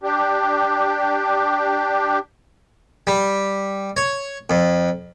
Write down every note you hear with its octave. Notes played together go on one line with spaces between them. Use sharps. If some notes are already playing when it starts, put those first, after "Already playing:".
D4 G4
G3
C#5
F2